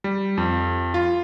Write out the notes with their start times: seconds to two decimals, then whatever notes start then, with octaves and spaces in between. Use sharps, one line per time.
0.04 G3
0.37 F2
0.94 F4